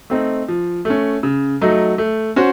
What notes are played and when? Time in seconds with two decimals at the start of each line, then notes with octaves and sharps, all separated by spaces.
0.10 A3 C4 D#4
0.48 F3
0.85 A3 C#4
1.23 C#3
1.61 F#3 A3 D#4
1.98 A3
2.36 C#4 F#4 C5